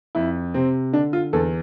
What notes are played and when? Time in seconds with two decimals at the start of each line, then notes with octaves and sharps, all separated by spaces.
0.15 F2 E4
0.54 C3 C4
0.93 D3 D4
1.13 F4
1.33 E2 A4